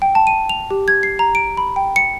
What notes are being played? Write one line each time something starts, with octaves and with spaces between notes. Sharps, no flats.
G5
A5
D#7
F7
G4
G#6
C7
A#5
D7
B5
G5
C#7